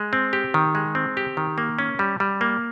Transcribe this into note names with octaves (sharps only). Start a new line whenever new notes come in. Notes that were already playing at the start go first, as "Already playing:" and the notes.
Already playing: G#3
C4
G4
D#3
G#3
C4
G4
D#3
A#3
C#4
G3
G3
A#3